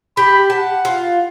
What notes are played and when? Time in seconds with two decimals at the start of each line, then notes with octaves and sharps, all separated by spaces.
0.17 G4 B5
0.50 F#5 A5
0.85 F4